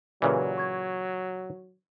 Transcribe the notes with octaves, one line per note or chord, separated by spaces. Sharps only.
A#2 C#3 E3 F#3 G4 B4 D5
C#6 G#6